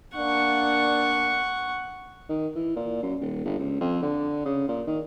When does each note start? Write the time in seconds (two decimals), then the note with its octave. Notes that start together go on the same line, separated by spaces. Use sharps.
0.16 A#3 D4 F#5 C#6
2.29 D#3
2.56 E3
2.76 A#2
3.03 F#2
3.21 D#1
3.45 G1
3.59 C#2
3.81 F2
4.02 D3
4.46 C#3
4.68 A#2
4.87 D#3